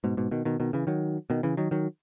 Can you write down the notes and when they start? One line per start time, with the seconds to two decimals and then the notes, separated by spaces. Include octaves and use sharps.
0.04 G#2 B2
0.17 G#2 B2
0.31 B2 D#3
0.45 B2 D#3
0.60 B2 D#3
0.73 C#3 E3
0.87 D#3 F#3
1.30 B2 D#3
1.43 C#3 E3
1.57 D#3 F#3
1.71 D#3 F#3